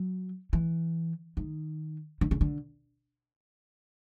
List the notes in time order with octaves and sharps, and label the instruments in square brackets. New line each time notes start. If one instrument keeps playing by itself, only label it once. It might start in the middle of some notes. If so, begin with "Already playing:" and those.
Already playing: [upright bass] F#3
E3
D#3
D3
C#3
D3